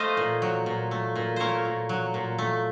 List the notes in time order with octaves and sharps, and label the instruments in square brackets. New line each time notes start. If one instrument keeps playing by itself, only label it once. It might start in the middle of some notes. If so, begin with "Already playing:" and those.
Already playing: [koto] A3 C5 D#5 F5
A#2
F#3
A#2
A3
A#2
A3 A#4 C5 C#5
A#2
F#3
A#2
A3